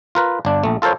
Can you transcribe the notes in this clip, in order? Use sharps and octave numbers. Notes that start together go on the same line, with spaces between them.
F4 A#4 B4
G1 D4
A#1 A3
F4 A4 A#4 C5 C#5